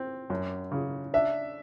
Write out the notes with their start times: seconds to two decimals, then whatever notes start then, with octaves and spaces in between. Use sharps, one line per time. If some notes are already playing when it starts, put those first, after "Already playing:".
Already playing: C4
0.30 F#2
0.72 C#3
1.14 D4 E5